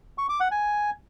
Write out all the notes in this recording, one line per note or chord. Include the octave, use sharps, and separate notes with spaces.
C#6
D6
F#5
G#5